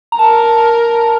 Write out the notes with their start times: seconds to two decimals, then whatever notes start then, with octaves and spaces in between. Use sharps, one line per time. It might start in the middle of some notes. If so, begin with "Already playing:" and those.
0.12 A#5
0.19 A#4 A5